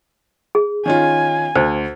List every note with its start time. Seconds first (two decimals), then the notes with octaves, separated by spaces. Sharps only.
0.55 G#4
0.86 D#3 C#4 F4 G#5
1.56 D2 C5